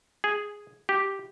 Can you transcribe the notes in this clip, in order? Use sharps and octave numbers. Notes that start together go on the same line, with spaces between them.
G#4
G4